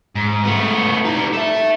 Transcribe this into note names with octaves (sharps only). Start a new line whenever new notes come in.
G#2
A3 B3
G3 D#4
A4 E5